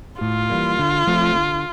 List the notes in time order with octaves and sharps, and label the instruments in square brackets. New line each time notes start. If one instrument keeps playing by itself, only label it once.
[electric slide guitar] A2 [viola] F4
[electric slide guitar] E3 G3 A#3
D3
F3 A3 C4
D3